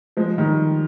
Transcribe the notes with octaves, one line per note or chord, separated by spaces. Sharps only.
F3 G#3
D#3 G3